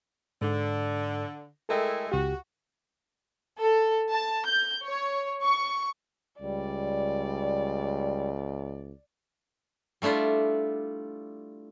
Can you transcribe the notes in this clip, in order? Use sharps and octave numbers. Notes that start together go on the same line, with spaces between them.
G#2 D3
G#3 A3 E4 A4 A#4 G5
C#2 F#4 G4
A4
A5
G6
C#5
C#6
C#2 G3 D5
G3 A3 D4 E4 F4